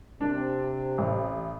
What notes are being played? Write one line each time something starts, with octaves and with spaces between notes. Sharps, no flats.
C3 D4
A1